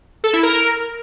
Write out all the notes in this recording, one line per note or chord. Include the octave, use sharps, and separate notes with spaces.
A4
E4
A#4